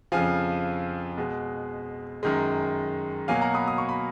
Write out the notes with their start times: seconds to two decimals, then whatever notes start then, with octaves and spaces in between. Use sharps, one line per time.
0.12 F2 C#3 F3 F5 G#5
1.18 B2 G#3
2.23 F#2 D#3 G#3
3.28 B2 F#3 A#3 F5 G#5
3.41 F#5 A#5
3.54 B5 D#6
3.68 D#6
3.78 C#6
3.89 B5